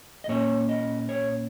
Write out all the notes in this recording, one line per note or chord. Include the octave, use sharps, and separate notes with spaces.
D#5
A#2 A#3 C#4 C#5
D#5
C#5